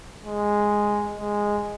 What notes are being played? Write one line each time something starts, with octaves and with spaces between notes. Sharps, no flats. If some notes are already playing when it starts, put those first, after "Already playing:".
G#3
G#3